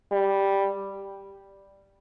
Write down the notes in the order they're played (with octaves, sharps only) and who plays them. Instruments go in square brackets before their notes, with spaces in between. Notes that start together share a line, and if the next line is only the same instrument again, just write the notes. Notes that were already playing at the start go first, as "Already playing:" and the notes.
[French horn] G3